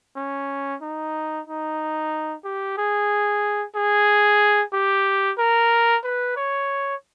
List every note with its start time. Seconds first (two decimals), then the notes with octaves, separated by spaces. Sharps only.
0.16 C#4
0.82 D#4
1.47 D#4
2.44 G4
2.78 G#4
3.75 G#4
4.73 G4
5.39 A#4
6.04 B4
6.36 C#5